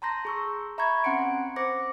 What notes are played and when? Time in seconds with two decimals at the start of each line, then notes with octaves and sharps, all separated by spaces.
0.02 A5 A#5 C6 G6 A#6
0.25 G#4 C#6 E6
0.78 E5 A#5 B5 C#6 G6 G#6
1.04 C4 C#4 F#5 C6 C#7 D7
1.56 C5 D6 A#6 C#7